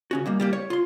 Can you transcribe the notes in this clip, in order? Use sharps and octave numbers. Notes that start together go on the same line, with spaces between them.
C#3 C#4 F#4
B2 G3 A#3
G3 A#3 G4
C#5
F4 C6